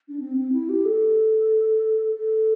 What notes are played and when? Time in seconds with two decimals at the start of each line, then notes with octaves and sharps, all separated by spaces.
0.08 D4
0.20 C4
0.37 C4
0.52 E4
0.69 G4
0.85 A4
2.15 A4